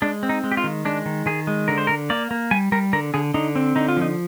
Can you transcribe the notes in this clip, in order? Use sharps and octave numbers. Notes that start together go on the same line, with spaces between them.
G#3 D4
C4
D#4
G#3
G4
F4
D#3
G#3 D4
D#3
D#3 G#4
G#3
D3 A#4
C5
D3 A#4
A#3 D5
A#3
G3 G#5
G3 A#4
D3 A#4
D3 G#4
D3 D#4
C4
D3 D#4
F4
F3 D#4